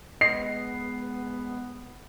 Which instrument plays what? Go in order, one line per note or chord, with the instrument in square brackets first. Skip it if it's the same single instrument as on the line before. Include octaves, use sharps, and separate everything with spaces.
[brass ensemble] G#3 B3 [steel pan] D#5 [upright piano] C7